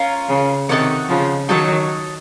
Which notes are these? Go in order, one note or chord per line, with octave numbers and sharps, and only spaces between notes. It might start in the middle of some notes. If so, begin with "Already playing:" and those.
Already playing: C#4 F4 A#4
C#3
C3 D#3 D#4 A4 C#5 F#5
C#3 F3
D#3 F#3 D#4 A4 C#5 F#5